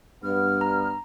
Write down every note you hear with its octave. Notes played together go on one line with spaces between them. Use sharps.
G2 B3 F6
A#5